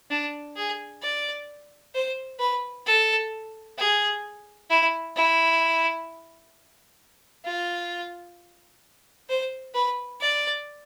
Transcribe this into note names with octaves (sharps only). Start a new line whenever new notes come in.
D4
G#4
D5
C5
B4
A4
G#4
E4
E4
F4
C5
B4
D5